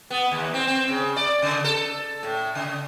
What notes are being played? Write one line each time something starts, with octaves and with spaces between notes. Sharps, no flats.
B3
D#2
C4
C4
C#3
D5
C#3
A4
A2
C#3